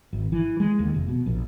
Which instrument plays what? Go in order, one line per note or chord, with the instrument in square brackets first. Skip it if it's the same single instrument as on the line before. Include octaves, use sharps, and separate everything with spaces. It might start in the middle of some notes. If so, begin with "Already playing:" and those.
[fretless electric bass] G#1
E3
G#3
D#2
F1
B2
A#1